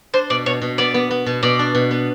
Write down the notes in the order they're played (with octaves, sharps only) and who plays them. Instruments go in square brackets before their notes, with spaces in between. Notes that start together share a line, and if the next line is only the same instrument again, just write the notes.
[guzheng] D4 [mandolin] C5
[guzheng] B2 [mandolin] D5
[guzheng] B2 [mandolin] C#5
[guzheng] B2
[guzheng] B3 [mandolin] D5
[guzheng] B3
B3
B2
[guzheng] B2 [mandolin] D5
[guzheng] D4
B2
B3